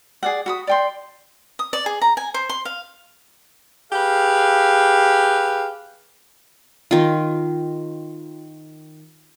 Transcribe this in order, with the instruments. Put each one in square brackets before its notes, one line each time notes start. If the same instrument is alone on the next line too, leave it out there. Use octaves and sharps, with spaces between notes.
[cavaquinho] G#4 D5 F#5
F#4 B5 D#6
D5 G5 C6
D#6
D5
G#4
A#5
G#5
C5
C6
F5
[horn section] G4 G#4 B4 F5
[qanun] D#3 F4